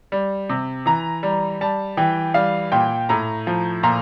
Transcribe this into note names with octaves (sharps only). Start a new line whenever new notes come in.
G3
C3
E3 A#5
G3
G3 A5
E3 G5
G3 F5
A#2 G5
A2 A#5
F3
A#2 A#5